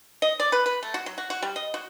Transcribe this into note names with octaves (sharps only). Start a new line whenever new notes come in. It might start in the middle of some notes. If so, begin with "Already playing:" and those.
D#5
D5
B4
B4
A3
F#4
F#3
F#4
F#4
G3
D#5
F#4